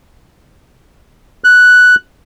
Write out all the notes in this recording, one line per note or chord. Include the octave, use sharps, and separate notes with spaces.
F#6